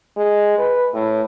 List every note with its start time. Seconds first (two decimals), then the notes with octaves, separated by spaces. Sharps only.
0.17 G#3
0.58 B4
0.94 A2